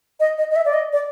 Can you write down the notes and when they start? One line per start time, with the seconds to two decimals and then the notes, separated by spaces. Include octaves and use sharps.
0.20 D#5
0.38 D#5
0.51 D#5
0.56 E5
0.65 D5
0.73 D#5
0.93 D5